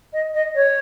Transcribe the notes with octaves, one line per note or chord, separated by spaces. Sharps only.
D#5
D#5
C#5